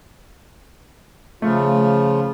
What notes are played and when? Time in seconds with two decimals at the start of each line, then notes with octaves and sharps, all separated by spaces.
1.42 C#3 F3 A3 F4